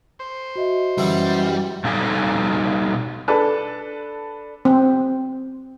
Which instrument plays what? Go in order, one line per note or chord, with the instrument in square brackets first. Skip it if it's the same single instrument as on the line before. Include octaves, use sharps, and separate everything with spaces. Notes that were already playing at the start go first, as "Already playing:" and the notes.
[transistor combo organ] C5
[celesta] F#4 D#5 E5
[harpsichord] F#2 E3 F#3 [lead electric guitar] G3
[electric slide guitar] B2 G3 D#4 A4 F5 G#5
[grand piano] D4 A4 B4
[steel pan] C4